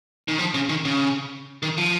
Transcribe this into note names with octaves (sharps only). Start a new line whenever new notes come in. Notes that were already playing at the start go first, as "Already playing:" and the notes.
D#3
F3
C#3
D#3
C#3
D#3
F3